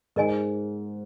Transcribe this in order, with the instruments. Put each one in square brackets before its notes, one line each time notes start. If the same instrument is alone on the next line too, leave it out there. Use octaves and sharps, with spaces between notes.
[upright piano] G#2 [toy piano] A#4 D#5 G#5